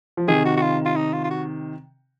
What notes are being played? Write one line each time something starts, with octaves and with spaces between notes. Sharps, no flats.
F3
C3 D#3 G#4
F#4
F#4
F4
F4
D#4
F4
F4
F#4